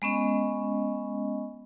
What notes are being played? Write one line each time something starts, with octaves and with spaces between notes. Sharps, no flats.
G#3 B3 C#4 D#5